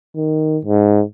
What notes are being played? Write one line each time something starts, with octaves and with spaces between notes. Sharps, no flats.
D#3
G#2